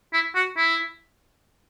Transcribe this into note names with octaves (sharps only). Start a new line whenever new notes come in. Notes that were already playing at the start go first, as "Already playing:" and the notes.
E4
F#4
E4